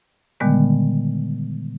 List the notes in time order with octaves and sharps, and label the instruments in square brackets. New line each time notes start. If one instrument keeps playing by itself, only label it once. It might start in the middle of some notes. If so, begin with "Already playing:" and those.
[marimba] A#2 D3 D#3 G3 G#3 B3